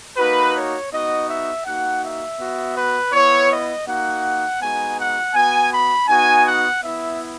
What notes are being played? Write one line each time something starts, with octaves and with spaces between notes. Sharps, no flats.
A#3 D#4 F#4 B4
C#5
B3 D#4 F#4 D#5
E5
A#3 D#4 F#4 F#5
E5
B3 F#4
B4
B3 E4 C#5
D#5
A#3 D#4 F#4 F#5
G#3 B3 D#4 F#4 G#5
F#5
B3 F#4 G#5
B5
B3 D#4 F#4 G#5
F#5
B3 E4 E5